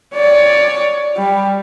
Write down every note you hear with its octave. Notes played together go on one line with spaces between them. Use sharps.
C#5 D5
G3